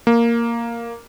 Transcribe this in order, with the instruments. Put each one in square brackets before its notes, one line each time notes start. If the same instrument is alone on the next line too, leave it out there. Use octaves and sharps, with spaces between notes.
[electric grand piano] A#3